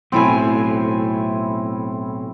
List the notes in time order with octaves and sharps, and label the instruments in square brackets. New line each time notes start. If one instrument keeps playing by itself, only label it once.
[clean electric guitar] B1 A2 [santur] C4 E4 G#5